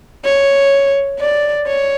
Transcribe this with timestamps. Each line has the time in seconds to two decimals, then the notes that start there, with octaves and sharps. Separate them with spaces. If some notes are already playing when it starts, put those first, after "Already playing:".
0.24 C#5
1.19 D5
1.67 C#5